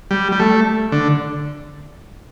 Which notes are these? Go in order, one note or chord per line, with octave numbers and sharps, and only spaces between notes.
G3
G3
A3
D3